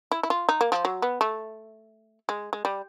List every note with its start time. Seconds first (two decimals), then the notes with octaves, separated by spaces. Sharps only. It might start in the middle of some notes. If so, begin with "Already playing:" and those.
0.12 E4
0.23 E4
0.30 F4
0.49 D#4
0.61 A#3
0.72 F3
0.85 F#3
1.02 B3
1.21 A3
2.29 G#3
2.53 G#3
2.65 G3